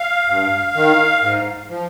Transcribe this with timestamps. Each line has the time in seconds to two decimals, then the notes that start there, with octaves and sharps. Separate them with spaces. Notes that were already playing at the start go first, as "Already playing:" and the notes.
Already playing: F5
0.29 G2
0.75 D#3
1.22 G#2
1.70 F3